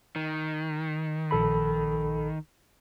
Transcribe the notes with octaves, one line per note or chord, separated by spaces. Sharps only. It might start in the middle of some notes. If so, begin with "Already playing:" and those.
D#3
A#1 A4 B5